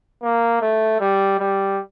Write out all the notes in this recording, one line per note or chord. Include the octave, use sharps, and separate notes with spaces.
A#3
A3
G3
G3